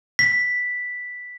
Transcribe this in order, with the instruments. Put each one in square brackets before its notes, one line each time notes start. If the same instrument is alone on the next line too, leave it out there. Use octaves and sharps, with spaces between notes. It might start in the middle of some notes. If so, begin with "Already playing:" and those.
[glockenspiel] B6